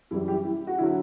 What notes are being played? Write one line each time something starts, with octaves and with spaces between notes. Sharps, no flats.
F#2 E3 G3 E4
E4 G4
E4
F#4
D3 F#3 E4